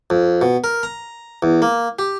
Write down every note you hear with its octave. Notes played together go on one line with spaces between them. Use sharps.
F2
B2
A#4
A#5
E2
A#3
G4